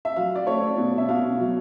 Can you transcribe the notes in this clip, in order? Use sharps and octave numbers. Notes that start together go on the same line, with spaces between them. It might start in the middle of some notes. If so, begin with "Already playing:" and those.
E5
F#3 F5
D5
A3 C#5
B2
E5
B2 F5
F#3